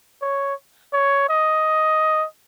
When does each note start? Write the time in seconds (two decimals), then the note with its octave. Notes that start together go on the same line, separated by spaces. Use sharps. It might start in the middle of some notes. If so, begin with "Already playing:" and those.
0.21 C#5
0.93 C#5
1.29 D#5